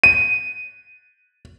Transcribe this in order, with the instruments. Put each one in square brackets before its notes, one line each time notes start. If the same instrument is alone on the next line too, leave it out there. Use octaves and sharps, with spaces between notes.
[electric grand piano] D#7